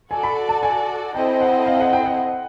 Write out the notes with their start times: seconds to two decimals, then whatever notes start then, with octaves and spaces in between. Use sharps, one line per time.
0.11 F#4 A4 D5 G#5
0.23 B5
0.49 A5
0.63 G#5
1.15 C4 E4 A4 C5 D#5 G5
1.41 F#5
1.66 F5
1.80 F#5
1.93 G5
2.06 F#5